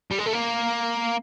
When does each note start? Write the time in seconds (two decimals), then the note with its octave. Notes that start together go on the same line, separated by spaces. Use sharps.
0.11 G3
0.19 G#3
0.26 A3
0.33 A#3